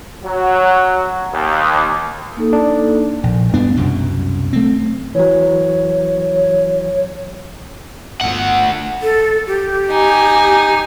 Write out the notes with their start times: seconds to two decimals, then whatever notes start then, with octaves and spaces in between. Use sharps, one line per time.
0.24 F#3
1.33 D#2
2.37 A#3 D#4 A4
2.53 D4
3.23 A#1
3.54 G2 B3 D4
3.76 C2 F#2 B2
4.53 A3 C4
5.15 E3 F#3 C#5
8.21 G1 D2 F4 F#5
9.02 A4
9.47 G4
9.90 D#4 G#5